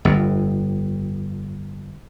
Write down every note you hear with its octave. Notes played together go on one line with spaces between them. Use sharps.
G1 F2